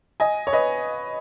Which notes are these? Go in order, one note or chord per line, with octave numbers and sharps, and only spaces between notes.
D#5 G#5
C#5
B4 D#5